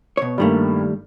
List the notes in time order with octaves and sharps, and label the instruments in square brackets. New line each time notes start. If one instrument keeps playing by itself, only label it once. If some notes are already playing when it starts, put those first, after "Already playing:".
[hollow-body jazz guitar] B2 C#5
[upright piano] G2 A#3 [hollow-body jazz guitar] D#3 G3 A3